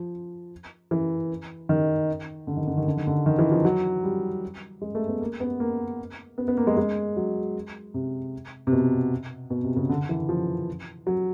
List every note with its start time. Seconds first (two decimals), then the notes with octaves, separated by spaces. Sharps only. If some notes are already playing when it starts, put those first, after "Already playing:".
Already playing: F3
0.91 E3
1.69 D#3
2.47 D3
2.57 D#3
2.68 D3
2.77 D#3
2.87 D3
2.97 D#3
3.07 D3
3.26 D#3
3.39 E3
3.52 F3
3.65 F#3
4.03 G3
4.82 G#3
4.95 A3
5.08 B3
5.21 A#3
5.40 B3
5.60 A#3
6.38 B3
6.48 B3
6.57 A#3
6.67 G#3
6.77 G#3
7.16 F#3
7.94 C3
8.67 C3
8.72 B2
9.50 B2
9.64 C3
9.76 C#3
9.90 D3
10.09 E3
10.29 F3
11.07 F#3